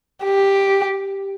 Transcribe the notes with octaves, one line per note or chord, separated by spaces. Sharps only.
G4